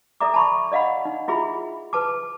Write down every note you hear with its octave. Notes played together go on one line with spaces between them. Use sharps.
A4 D5 E5 A#5 D6
A5 B5 C#6
D5 D#5 F5 F#5 B5
D#4
E4 F4 G#4 E5 B5
B4 A5 D6